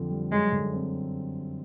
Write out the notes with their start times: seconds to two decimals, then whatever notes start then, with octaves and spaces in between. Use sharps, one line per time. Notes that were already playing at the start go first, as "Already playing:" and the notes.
Already playing: F2 D3 C4
0.10 G3
0.31 F#2 G#3
0.52 D3
0.73 C4